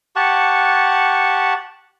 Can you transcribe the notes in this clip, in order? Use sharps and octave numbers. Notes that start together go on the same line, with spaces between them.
G4 F#5 A5 C#6